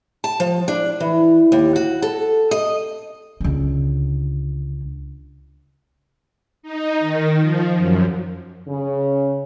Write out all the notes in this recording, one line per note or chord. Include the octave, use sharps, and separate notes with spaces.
A5
F3
D4
E3
D#2
F#4
A4
D#5
C#2 D3
D#4
D#3
F3
F#2
C#3